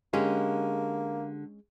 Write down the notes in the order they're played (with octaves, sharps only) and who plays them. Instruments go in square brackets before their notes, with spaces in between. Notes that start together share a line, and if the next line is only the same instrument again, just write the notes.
[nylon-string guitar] D3 G4 [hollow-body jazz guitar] G#3 C#4 G#4 [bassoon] A#3